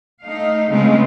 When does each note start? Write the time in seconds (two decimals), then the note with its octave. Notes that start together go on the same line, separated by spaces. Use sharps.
0.23 A3 D#4 F5
0.70 C#3 G#3 A3 B3 C4 F4